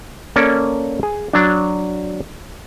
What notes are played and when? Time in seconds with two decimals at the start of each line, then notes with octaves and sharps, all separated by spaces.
0.36 A#3 C#4 A4 D5
1.03 G#4
1.33 F#3 D4